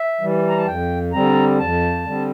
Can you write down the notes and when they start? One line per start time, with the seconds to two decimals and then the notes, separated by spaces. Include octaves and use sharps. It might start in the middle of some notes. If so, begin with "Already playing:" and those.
Already playing: E5
0.21 E3 G3
0.49 A#5
0.58 A5
0.67 F2 G5
1.13 D3 G3 C4 A#5
1.59 F2 A5
2.04 D3 G3 C4